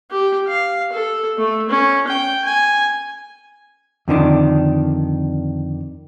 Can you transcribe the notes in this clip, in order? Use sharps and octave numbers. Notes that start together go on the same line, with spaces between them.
G4
F5
A4
A3
C#4
G5
G#5
F2 D3 D#3 D4